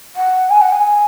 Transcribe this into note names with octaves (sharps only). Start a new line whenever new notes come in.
F#5
G#5
F#5
G#5